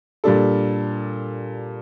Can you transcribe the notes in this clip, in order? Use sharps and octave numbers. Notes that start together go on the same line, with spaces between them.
A#2 G3 D4 A4